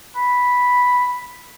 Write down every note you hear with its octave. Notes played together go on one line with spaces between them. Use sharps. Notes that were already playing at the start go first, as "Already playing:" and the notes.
B5